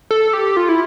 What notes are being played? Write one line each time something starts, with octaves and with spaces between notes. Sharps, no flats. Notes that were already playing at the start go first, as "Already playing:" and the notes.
A4
G4
F4
E4